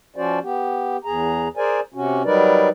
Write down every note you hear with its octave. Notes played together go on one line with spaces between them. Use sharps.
F3 C#4 F#4 C5 D5
B3 G4
E2 G#4 A#5
G#4 A#4 C5 D5 G#5
C3 C#4 F#4
F#3 G3 D#4 A#4 B4 D5